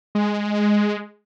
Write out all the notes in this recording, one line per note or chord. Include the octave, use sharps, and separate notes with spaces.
G#3